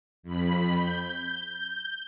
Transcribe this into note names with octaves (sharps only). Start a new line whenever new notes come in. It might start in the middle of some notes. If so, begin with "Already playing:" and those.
F2 B5
G6